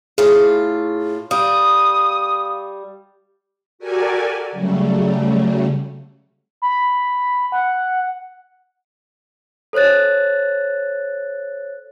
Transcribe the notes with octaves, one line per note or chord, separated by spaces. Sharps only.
A2 F4 G#4
G3 F5 D#6
F#4 G4 A4 A#4 D5 G#5
C#3 F#3 G3 A3
B5
F#5
A4 C5 C#5 F#6 A6